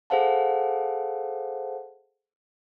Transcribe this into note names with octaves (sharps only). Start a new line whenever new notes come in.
G#4 A4 C5 F5 F#5 A5